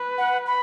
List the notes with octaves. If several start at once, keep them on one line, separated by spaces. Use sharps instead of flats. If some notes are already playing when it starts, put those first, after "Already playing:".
Already playing: B4
F#5
B5